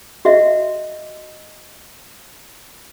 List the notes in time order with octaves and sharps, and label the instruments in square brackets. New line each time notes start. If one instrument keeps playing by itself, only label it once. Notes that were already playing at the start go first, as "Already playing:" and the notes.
[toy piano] F#4 D#5 E5